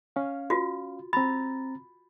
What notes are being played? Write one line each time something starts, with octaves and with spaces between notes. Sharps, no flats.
C#4 F5
F4 F#4
C4 A#5 B5 A6